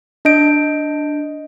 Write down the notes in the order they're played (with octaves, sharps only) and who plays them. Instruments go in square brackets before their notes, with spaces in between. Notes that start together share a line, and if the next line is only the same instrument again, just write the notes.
[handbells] D4 D#5 G6 D7